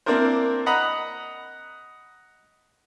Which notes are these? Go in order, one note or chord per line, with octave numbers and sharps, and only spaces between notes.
A#3 C4 D4 E4 A#4 C5
D#5 F#5 A#5 B5 D#6